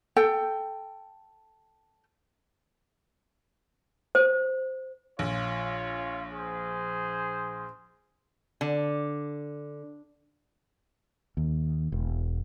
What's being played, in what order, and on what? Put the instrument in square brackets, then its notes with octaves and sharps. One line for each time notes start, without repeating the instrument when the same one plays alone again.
[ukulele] A4 G5
[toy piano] C5
[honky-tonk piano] A#1 [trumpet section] F4 C#5
[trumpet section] G#4 C5
[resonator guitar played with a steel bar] D3
[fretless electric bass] D#2
E1